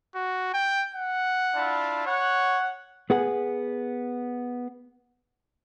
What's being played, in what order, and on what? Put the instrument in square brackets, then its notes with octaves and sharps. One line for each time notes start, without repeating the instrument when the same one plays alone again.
[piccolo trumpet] F#4
G5
F#5
[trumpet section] D4 E4 F4
[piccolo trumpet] C#5 [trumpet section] F#5
[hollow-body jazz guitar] B3 G#4 F#5